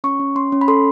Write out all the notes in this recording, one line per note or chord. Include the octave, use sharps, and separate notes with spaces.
C#4 C#6
C#4
C#4 C6
C#4
B5
A4 C6